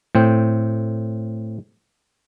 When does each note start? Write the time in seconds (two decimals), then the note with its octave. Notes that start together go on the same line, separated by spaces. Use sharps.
0.15 A2 C4 G5